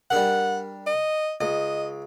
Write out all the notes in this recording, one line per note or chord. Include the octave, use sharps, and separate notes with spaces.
G3 D4 A#4 F#5
D#5
C#2 D#5